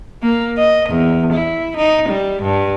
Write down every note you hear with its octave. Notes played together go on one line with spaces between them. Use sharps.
A#3
D#5
E2
E4
D#4
G3
G2